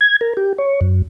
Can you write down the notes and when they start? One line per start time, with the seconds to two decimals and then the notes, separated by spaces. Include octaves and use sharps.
0.01 G#6
0.21 A#4
0.37 G4
0.58 C#5
0.81 F#2